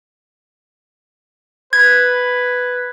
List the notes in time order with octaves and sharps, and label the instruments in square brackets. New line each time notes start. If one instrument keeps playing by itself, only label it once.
[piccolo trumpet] B4 [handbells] G#6